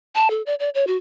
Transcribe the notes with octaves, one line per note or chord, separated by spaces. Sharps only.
A5
A4
D5
D5
C#5
F#4